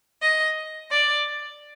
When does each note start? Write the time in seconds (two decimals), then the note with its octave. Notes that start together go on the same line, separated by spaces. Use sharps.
0.22 D#5
0.91 D5